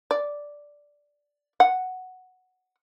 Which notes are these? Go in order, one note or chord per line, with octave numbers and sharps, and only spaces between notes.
D5
F#5